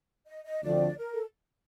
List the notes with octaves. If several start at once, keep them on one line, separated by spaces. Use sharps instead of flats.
D#5
D#5
D2 D3 F3 A3 C4 D5
A#4
A4